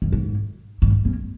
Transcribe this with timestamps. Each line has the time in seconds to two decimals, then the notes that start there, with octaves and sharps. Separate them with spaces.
0.02 F#2
0.12 G#2
0.82 G#2
1.05 F#2